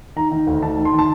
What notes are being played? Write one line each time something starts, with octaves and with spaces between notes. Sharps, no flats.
D#3 A#5
D#3
D2
D#3 A5
D#3
C6
D#3
A5